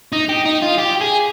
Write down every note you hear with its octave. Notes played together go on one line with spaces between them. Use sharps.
D#4
G4
D#4
F4
G4
G#4